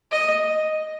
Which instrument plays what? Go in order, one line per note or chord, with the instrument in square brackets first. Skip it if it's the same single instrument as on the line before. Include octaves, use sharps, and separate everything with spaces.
[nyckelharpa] D#5